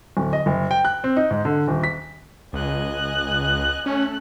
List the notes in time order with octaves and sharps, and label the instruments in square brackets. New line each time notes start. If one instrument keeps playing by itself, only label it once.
[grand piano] D1
D#5
F#1
G5
F#6
C4
D#4
G#2
D3
D#1
B6
[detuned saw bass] C#2 [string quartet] D#5 G#5 F#6
[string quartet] A3 A4 F#6 [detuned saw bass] C#4